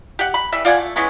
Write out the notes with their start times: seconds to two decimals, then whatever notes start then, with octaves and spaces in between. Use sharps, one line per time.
0.19 G4 F#5
0.34 B5
0.53 E3 G3 E5
0.65 F4 D5 F#5 G#5
0.78 A3
0.96 E3 G#3 B3 C#4